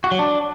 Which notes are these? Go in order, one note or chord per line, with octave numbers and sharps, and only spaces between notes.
F#4
F#3
D4